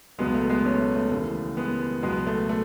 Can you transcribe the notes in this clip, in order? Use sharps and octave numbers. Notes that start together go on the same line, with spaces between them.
C#2 B2 F#3 G#3 B3
A3
G#3 B3
A3 C#4
A3
A3
D#2 C#3 E3 A3
G#3 B3
C#2 B2 F#3 G#3 B3
A3
A3